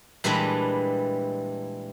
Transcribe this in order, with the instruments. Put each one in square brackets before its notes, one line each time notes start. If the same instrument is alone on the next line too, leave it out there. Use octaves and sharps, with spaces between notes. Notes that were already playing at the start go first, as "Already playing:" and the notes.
[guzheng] A#2 E3 G3 G#3 D4 B4